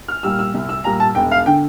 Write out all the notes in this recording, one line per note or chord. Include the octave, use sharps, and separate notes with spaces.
F6
A#2 G3 E6
E6
C2
E6
A#2 G3 A#5
A5
E1 G5
F5
D3 G5